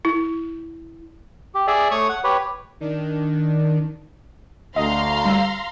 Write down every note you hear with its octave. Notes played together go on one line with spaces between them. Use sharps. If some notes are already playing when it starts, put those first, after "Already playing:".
E4
G4
G#4 D5 E5
A3 C#5 C#6 D#6
F#5
G4 B4 C#5
D#3 D4
D2 D#5 F5 A#5 C6
G3 E6